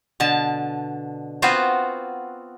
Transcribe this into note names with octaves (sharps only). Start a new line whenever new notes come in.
B2 D3 A5
B3 C4 F4 F#4 C5